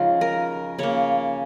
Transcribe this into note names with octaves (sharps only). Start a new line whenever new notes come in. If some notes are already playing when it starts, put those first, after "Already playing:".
Already playing: C#3 F3 G#3 D#4 F4
A#4
C#3 A#3 C#5